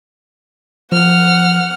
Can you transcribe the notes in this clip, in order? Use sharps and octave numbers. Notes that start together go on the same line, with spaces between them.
F3 F#5 F6